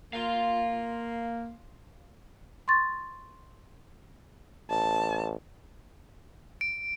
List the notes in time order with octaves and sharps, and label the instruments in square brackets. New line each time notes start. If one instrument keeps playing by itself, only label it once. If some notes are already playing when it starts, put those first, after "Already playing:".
[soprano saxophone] A#3 [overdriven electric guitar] F5 C6
[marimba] C6 C#6 A6
[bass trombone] A1 [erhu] A5
[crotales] D7